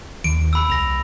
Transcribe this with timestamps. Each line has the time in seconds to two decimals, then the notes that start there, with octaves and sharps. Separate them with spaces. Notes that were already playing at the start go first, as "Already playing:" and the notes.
0.24 D#2 D7
0.53 B5 E6
0.70 C2 A#6 F7